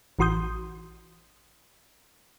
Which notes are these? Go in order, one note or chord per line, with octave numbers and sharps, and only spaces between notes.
A1 E3 F#4 C6 D#6 G6